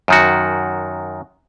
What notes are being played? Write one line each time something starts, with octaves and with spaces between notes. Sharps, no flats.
F#2 D#3 F#4